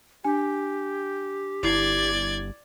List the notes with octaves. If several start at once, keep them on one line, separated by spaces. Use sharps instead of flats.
D4 G4 G#5
G1 E4 D5 G#6 A6 C7